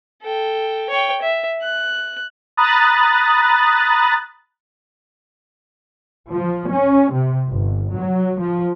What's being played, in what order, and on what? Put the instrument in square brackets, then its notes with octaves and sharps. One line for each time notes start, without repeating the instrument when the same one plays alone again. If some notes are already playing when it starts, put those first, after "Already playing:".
[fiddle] A4 G5
C#5 G5
E5
F#6
[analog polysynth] A#5 B5 D#6 F#6 A6
[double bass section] F3
C#4
C3
G1
F#3
F3